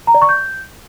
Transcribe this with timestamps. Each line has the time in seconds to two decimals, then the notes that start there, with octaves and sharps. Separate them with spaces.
0.07 A#5
0.14 D5
0.22 C#6
0.29 G6